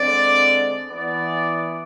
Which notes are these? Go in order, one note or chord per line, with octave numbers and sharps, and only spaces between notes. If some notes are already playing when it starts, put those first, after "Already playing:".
Already playing: D3 G#3 C4 D5
E3 B3 D5